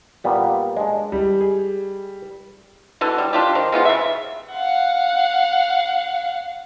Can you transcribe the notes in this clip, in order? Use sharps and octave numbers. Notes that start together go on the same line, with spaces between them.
A#2 G3 B3
G#3 D4
G3
G#4
B2 D3 E3
G3
D4 F4 G4
D#3 C5
G#3 B3 F4 G4
C#3 E5
F5 F#5